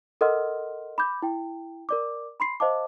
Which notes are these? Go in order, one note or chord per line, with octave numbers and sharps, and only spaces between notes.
A4 A#4 D#5 F#5 C6 F6
B5 D6 G6
E4 G5
A#4 D5 D6
B5 C6 C7
C5 D#5 F5 A5 D6